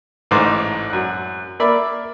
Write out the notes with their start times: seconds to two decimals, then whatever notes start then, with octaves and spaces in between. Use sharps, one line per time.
0.31 A1 G#2 D#4 C5 D6 F#6
0.90 F#2 F#6
1.60 A#3 D5 E5 B5